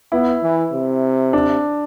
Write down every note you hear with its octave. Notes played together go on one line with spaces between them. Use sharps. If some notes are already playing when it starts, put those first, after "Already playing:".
B3 E4
E3
C3
D4